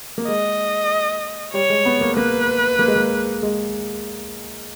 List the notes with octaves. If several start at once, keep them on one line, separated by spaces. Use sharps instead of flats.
A#3
G#3 D#5
G3 C#5
G#3
B3
A#3
A#3 B4
A#3
G#3
A#3
G#3